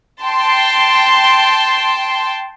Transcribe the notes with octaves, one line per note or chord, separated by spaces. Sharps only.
G5 A5 C6